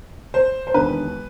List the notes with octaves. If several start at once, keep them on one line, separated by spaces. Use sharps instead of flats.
C5
C5
E1 D#2 D3 B4